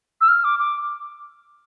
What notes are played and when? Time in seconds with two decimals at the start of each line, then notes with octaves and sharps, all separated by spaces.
0.21 E6
0.28 F6
0.44 D6
0.59 D6